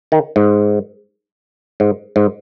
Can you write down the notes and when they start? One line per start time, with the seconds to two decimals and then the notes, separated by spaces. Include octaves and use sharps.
0.12 D#3
0.36 G#2
1.80 G#2
2.16 G#2